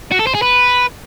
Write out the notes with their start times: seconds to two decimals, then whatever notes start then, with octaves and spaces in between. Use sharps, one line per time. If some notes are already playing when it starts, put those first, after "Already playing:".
0.12 F#4
0.19 A4
0.27 C5
0.34 G#4
0.42 B4